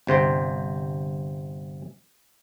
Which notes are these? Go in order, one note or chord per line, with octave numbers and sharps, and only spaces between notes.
G1 C3 C5 G5